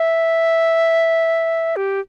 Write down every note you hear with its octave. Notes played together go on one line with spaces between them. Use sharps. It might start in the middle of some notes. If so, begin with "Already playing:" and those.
Already playing: E5
G4